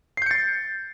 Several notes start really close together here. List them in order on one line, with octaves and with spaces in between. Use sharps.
C7 G6 C#7 A6